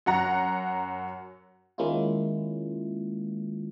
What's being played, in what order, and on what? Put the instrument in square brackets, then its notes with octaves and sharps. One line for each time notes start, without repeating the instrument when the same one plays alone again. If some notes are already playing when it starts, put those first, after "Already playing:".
[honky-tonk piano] F#2 F#5 A#5
[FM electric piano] D#3 G#3 A#3 C#4 E4 F4